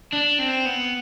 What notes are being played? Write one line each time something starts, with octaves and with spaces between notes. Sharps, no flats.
D4
C4
B3